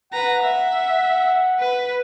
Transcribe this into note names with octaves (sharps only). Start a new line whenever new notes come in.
B4 F#5 A#5
E5
B4